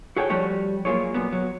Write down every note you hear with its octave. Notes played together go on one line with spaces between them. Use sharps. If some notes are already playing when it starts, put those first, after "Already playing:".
F#4 G#4 A4 C#5 F5 G5
F3 G3 A3 F#4 C#5
F#3 A#3 F4 G#4 C#5
F#2 A#2 B3
F#3